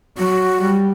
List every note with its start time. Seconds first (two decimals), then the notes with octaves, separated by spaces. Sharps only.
0.17 F#3 F#4
0.61 G3